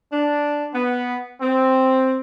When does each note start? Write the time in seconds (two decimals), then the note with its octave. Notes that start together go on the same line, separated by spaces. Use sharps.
0.12 D4
0.74 B3
1.41 C4